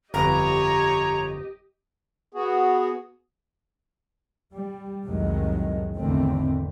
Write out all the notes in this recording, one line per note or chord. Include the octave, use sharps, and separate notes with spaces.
G1 F2 G4 B4 C#5 D#5 A#5
B3 F#4 G#4
G3
C2 F2 A2 D#3 F#3 G#3
G#1 E2 D3 D#3 A3 C4